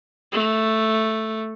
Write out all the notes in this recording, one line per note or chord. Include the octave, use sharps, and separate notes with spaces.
A3